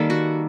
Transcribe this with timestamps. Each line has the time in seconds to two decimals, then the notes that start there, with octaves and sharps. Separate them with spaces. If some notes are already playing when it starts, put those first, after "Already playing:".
Already playing: D#3 G3 A#3 A4
0.10 F#4